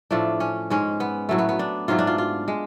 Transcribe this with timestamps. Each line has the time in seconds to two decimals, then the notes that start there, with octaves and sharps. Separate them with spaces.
0.11 A2 F3 A3 D4
0.40 C#4
0.70 G#2 G#3 C#4
1.00 B3
1.29 A2 F#3 A3
1.38 B3
1.49 B3
1.59 D4
1.88 G#2 F#3 A3 F4
1.99 D4
2.07 F4
2.18 F4
2.48 G#3